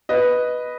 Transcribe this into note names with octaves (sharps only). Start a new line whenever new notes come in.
B4 D#5